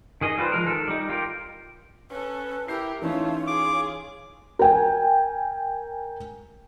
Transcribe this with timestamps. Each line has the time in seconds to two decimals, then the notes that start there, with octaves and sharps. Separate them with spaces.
0.21 D#3 G#4 D#5
0.37 G3 F4 B4 C5
0.52 F3 G#3 A#4
0.67 D#3 A4
0.88 G3 D#4
1.09 F4 G4 A#4
2.10 C#4 A4 B4
2.68 E4 G4 A#4 G6 C7
3.02 E3 A3 C#4 D#4 F4 C#5
3.47 F4 G#4 D6
4.59 A#4 G5 G#5